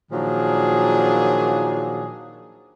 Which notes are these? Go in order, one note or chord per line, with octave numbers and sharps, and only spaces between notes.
A#2 D#3 F3 F#3 D4 G#4